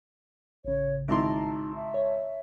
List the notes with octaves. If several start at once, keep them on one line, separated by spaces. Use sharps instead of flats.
A1 C#3 C#5
G#1 D#4 E4 A5 A#5 C6 D6
E5
C#5